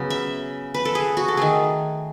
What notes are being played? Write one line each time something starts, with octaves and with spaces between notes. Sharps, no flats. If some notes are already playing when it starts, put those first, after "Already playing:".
Already playing: C#3 F#3 B3
E5
B4
A4
G#4
F#4
A4
D#3 A3 G#4